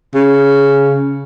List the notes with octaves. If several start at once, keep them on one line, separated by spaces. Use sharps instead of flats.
C#3